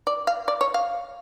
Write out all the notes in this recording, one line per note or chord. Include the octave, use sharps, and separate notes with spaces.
D5
F5
D5
C#5
F5